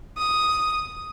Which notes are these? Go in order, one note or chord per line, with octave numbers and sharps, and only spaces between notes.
D#6